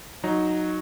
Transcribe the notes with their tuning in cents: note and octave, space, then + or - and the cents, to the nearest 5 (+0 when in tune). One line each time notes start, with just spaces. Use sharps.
F#3 -10 D#4 +0